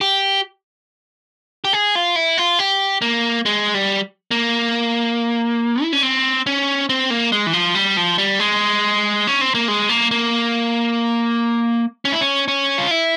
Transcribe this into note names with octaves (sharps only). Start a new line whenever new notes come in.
G4
G4
G#4
F4
E4
F4
G4
A#3
G#3
G3
A#3
E4
C#4
C4
C#4
C4
A#3
G#3
E3
F3
G3
F3
G3
G#3
C#4
C4
A#3
G#3
A#3
A#3
C#4
E4
C#4
C#4
F4
E4